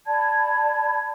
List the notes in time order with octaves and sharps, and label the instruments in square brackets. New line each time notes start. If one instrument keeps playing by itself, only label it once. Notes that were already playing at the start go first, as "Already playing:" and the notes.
[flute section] D5 A5 B5 G#6